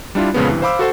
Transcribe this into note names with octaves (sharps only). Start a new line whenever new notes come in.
G3 D4 E4 F4
F2 A#2 C#3 G#3 B3
G2 C3 E3
C5 F5 B5 D6 E6
F#4 A4 C5 F#5